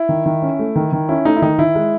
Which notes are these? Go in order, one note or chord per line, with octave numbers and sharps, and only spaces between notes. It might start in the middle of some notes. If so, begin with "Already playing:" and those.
Already playing: E4
D#3
D#3
C#4
A3
D#3
D#3
C#4 E4
A3 D#4
E4
D#3 D#4
D#3 E4
G#3